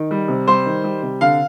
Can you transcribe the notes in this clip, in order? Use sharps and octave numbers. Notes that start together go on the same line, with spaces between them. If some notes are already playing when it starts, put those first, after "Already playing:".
Already playing: D#3
G3
C3
G3 C5
D#3
G3
C3
D3 F5